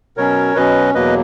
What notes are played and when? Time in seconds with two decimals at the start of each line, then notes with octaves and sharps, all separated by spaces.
0.17 B2 F#3 C#4 A#4 C#5
0.55 B2 F#3 C#4 B4 D#5
0.94 E2 B2 F#3 A#3 B4 D#5